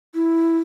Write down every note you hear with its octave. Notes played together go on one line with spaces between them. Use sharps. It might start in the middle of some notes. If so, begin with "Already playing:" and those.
E4